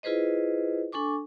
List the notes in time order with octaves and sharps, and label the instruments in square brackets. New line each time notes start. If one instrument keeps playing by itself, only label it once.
[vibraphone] E4 F4 G#4 B4 C5 D#5
D4 A4 G#5 C#6 D6